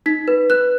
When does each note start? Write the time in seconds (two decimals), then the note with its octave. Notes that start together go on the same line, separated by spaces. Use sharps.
0.06 D#4 B6
0.28 B4
0.50 B4 F#6